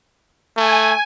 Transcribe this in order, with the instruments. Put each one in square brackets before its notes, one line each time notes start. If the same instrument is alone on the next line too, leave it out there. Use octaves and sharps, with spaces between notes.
[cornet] A3 [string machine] G#5